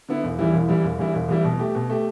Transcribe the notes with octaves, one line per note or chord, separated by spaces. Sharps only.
D3 B3 E4
E1
E2 E3 G3 E4
E1
E2 E3 G3 E4
E1
E2 E3 G3 E4
E1
E2 E3 G3 E4
B2
A3 G4
B2
A3 G4